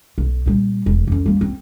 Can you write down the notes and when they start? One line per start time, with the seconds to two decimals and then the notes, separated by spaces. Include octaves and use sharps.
0.18 B1
0.46 A#2 G3
0.86 E1
1.07 F2 C#4
1.26 G3 A#3
1.41 C4 D#4